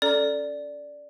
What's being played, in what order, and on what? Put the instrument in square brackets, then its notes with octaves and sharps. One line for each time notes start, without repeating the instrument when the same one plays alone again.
[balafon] C#4 A4 A#5 [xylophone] D5